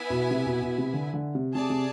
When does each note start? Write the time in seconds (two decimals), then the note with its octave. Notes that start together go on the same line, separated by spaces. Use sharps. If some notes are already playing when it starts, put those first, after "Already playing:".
Already playing: B3 E4 B4 E5 G#5
0.10 B2
0.31 C3
0.46 B2
0.62 B2
0.78 C3
0.94 D3
1.14 D3
1.35 C3
1.55 C3 G#4 D5 A5
1.70 C3